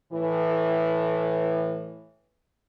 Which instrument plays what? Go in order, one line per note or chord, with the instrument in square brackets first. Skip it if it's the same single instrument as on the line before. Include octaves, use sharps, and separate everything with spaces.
[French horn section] A2 E3